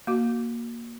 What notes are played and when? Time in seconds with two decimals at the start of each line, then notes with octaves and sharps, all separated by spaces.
0.07 A#3 F#4